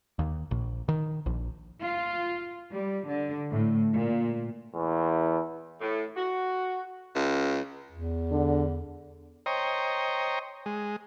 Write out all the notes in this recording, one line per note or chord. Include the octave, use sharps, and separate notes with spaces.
D#2
A#1
D#3
A#1
F4
G3
D3
A2
A#2
E2
A2
F#4
C#2
E2
D3
C5 C#5 D#5 G5 A#5
G#3